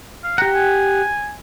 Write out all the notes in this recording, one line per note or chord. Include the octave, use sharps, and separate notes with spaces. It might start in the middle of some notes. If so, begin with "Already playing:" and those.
F5
G4 F#5 A#5
G#5